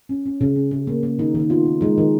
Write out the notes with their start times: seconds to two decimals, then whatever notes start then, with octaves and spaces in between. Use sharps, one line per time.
0.09 C#4
0.26 C#4
0.41 C#3
0.56 C#4
0.71 C#3
0.87 A#3
1.03 A#3
1.18 D#3 D#4
1.35 D#3
1.40 D#4
1.50 B3 F4
1.65 D#3
1.81 G#3 D#4
1.98 D#3